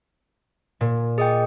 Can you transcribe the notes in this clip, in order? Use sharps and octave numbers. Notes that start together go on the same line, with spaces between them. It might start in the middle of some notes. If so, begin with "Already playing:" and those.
A#2
G#4 D#5 G5 D#6